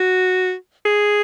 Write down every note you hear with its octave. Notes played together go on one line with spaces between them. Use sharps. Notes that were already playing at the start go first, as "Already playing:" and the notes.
Already playing: F#4
G#4